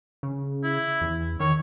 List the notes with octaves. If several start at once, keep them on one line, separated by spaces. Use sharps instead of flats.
C#3
E4
E2
D#3 C#5